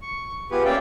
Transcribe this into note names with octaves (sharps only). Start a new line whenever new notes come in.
C#6
B3 F4 G4 G#4 B4
A#3 C#4 D5 E5 F5 G5